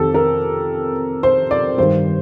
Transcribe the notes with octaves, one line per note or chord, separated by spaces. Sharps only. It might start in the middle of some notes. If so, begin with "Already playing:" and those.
Already playing: F2 C3 D#3 G4 A4
A#4
C5
D5
G2 D#3 G3 C5